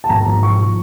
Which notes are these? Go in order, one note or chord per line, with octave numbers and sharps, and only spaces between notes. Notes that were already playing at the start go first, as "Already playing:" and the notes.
A5
G#1 A#5
G#1
F3 C#6
F3